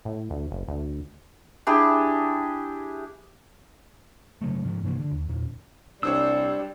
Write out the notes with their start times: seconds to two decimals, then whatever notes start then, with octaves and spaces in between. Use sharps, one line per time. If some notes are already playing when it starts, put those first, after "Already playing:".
0.05 A2
0.30 D2
0.51 F#1
0.68 D2
1.67 D4 E4 G4 G#4
4.41 C#3 F#3 A3
4.65 G#2 F3
4.83 G2 C3 E3 A#3
5.00 D3
5.11 D#2
5.29 E2 A#2
6.03 C2 G3 D4 C5 C#5 E6